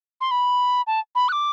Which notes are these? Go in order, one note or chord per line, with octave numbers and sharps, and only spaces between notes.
C6
B5
A5
B5
F#6
D6